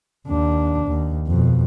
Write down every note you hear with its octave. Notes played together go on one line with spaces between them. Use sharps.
D#2 D4
D#2
F2 B2